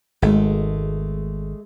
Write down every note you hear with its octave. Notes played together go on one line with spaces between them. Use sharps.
G#1 G#3 A3